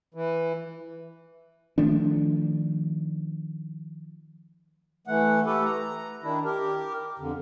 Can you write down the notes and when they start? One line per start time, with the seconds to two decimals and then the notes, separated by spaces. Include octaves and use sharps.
0.14 E3
1.78 D#3 F3 A3 D4
5.07 E3 A3 F#5
5.46 A3 G4 A4 B4
5.65 A#5
6.23 D#3 D4 E4
6.45 G4 A#4
7.19 F2 D3